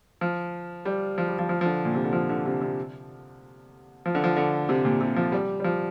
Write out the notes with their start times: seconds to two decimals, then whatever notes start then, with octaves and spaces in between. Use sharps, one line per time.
0.21 F3
0.85 G3
1.18 F3
1.28 G3
1.39 F3
1.49 F3
1.61 F3
1.65 D3
1.85 A#2
1.95 C3
2.04 D3
2.13 F3
2.29 D3
2.45 C3
2.61 C3
4.06 F3
4.15 D3
4.24 F3
4.36 D3
4.69 C3
4.85 A#2
5.01 C3
5.16 F3
5.32 G3
5.60 G3
5.64 F3